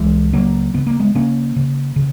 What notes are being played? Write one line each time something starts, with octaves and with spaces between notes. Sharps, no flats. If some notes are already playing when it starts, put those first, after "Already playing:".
Already playing: C#2 E3 G#3
C#3 F#3 A#3
C#3 B3
A#3
G#3 B3
C#3 A#3 C#4
C#3
C#3